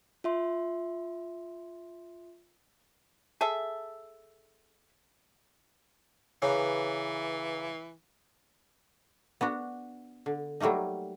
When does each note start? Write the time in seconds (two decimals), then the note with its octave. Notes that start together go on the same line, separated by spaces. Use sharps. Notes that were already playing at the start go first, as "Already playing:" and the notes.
0.24 F4 E5 C6
3.41 G#4 A4 E5
6.42 C#3 E3 B4 C#5 A#5 D6
9.41 B3 D4 F#4
10.26 D3
10.60 F#3 G3 A3 A#3 D#4